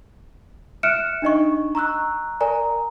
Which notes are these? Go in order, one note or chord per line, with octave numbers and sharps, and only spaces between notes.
E5 F6 F#6 C#7 D7 E7
D4 D#4 D#5 C#6
A#5 C#6 E6 F#6
A#4 D5 G#5 A#5